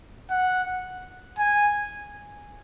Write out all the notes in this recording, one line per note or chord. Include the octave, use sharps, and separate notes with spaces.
F#5
G#5